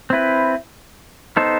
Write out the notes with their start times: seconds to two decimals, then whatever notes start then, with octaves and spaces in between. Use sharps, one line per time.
0.10 C4 E4 B4
1.37 B3 D#4 A4 C5